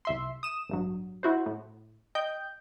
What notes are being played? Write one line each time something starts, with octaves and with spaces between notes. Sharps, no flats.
C2 E5 C6
D#6 E7
A1 G2 F#3
E4 F#4 C5
A2
D#5 G5 G6